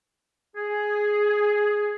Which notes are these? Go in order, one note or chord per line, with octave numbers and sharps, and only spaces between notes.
G#4